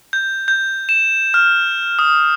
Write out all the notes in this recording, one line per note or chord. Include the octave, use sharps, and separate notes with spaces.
G6
G6
E7
F6
D#6